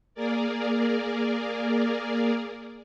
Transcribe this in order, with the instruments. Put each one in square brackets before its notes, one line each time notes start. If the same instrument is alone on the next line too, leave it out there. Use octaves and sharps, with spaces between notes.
[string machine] A#3 G#4 A#4 D5